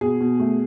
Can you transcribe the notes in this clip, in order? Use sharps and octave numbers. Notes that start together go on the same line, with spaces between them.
B2 G#4
B2
A3